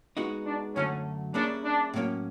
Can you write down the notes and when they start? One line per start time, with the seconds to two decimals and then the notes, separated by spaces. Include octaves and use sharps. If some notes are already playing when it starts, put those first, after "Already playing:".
0.17 G#3 B3 D#4 F#4
0.46 D4
0.75 F#2 D3 F#3 A3 C#4
1.34 G3 A#3 C#4 D4 E4 G#4
1.64 D4
1.94 A2 F#3 A#3 C#4